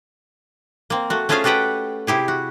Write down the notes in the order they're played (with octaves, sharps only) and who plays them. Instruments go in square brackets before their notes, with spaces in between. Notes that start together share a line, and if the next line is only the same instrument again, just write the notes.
[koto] A#3 C4
A3 F#4
A3 C#4 F4 G#4 C5 F5
F#4 G4 A4 B4 F#5 G5
C3 E4 G4 G#4
F#4